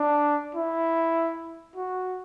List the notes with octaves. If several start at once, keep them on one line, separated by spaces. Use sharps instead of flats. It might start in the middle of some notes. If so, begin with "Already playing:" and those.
Already playing: D4
E4
F#4